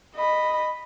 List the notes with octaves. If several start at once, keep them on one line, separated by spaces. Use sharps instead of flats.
D#5 B5